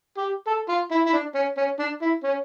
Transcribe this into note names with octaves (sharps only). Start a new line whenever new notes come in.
G4
A4
F4
E4
E4
D4
C#4
C#4
D4
E4
C#4